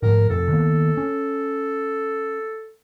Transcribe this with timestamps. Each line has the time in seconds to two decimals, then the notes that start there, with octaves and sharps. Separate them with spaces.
0.02 G#2 F3 A3 A#4
0.30 F2 C3 A4
0.52 D#3 A#3 B3
0.97 C#4